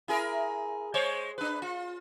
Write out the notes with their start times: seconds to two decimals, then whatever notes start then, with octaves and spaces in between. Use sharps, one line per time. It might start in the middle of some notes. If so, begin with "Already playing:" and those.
0.08 E4 G#4 A#4
0.94 G#3 C5 C#5
1.38 D4 B4
1.62 F4